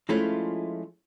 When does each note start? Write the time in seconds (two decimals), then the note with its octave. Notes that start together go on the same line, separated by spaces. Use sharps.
0.09 F3 G#3 A3 C#4 E4 F4